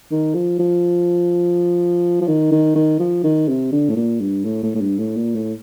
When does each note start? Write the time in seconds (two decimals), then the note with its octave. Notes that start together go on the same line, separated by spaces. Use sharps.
0.12 D#3
0.35 F3
0.60 F3
2.22 F3
2.28 D#3
2.52 D#3
2.76 D#3
3.00 F3
3.24 D#3
3.49 C3
3.72 D3
3.90 A2
3.96 A#2
4.21 G2
4.45 A2
4.63 A2
4.75 A2
4.81 G2
4.99 A2
5.16 A#2
5.35 A2